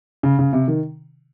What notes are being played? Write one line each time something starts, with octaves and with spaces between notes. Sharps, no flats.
C#3
C#3
C3
D#3